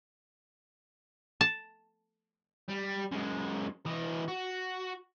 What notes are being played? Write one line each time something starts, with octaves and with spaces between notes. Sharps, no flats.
A5
G3
F#2 G#3
E3 D#5
F#4